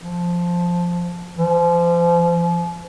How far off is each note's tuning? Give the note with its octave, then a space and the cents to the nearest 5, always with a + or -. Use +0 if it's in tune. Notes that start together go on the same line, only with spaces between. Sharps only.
F3 +0
F3 -30